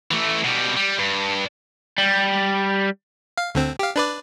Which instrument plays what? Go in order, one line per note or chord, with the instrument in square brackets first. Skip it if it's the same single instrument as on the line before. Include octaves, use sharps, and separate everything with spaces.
[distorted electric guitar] E3 A3
B2 G3
G3
G2
[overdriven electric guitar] G3
[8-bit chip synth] F5
D2 D3 C4
G4 F5
D4 B4 D5